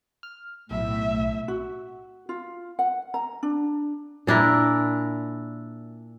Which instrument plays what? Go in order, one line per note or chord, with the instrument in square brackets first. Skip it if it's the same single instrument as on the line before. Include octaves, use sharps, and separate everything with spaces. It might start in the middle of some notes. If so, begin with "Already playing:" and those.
[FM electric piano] F6
[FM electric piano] B1 [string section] A2 [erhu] E5
[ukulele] F#4
F4
F#5
A#5
D4
[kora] A#2 D4 E4 A#4